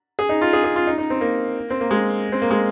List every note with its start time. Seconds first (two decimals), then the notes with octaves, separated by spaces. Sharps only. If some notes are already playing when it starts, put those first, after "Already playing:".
0.19 G#4
0.29 D#4
0.41 F4
0.53 G#4
0.64 G#4
0.76 F4
0.87 D#4
0.98 D#4
1.10 C4
1.21 A#3
1.70 C4
1.81 A#3
1.91 G#3
2.32 C4
2.42 A#3
2.51 G#3